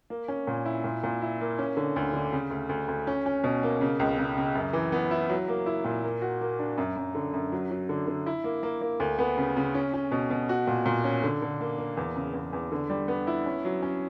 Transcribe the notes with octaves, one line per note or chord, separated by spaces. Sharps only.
A#3
C#4
A#2
E4
A#2
A#2
E4
A#3
C#4
D3
D2
D3
C#3
D2
D2
D2
C#4
C#4
B2
A#3
C#3
C#2
C#3
C#3
F#2
E3
B3
E4
F#3
A#3
E4
A#2
A#3
F#4
A#3
D4
F#2
F#2
D3
F#2
F#3
F#3
D3
D3
E4
A#3
A#3
A#3
D2
B3
C#3
C#3
C#4
C#4
B2
B2
F#4
A#2
A#2
C#4
D3
D3
A#3
A#3
E2
C#3
E2
E2
D3
G3
B3
E4
C#4
F#3
C#4